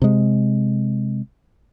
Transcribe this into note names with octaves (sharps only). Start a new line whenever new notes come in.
C3 G#3